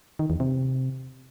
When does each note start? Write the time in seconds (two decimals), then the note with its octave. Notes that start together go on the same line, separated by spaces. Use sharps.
0.19 D#3
0.30 E2
0.40 C3